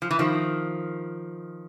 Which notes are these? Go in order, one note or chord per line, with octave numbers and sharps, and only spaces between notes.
F3
E3
D#3 F3